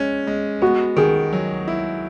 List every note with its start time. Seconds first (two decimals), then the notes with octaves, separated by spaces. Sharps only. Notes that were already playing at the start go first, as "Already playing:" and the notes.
Already playing: G#3 C#4
0.27 G#3
0.62 B3 F#4
0.97 D#3 G#4
1.33 F#3
1.68 E4